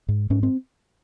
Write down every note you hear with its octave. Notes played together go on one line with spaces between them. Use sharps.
G#2
G#2 C#4
C4